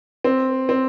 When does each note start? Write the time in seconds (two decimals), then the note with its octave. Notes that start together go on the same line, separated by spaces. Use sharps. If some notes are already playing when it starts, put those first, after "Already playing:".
0.24 C4
0.69 C4